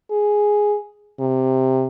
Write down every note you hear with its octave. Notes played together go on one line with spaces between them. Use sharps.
G#4
C3